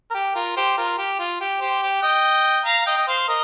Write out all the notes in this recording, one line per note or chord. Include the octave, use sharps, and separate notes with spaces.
A#4
G4
F4 A#4
G4 C5
F4 A#4
G4
F4
G4
G4 C5
G4
D#5 G5
F5 A#5
F5
D#5 G5
D#5
C5 F5
A#4 D#5